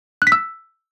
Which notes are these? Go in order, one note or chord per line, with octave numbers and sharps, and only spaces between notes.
F#6
B6
E6